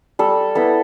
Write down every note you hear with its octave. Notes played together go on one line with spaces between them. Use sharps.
G3 A4
B3 E4 A4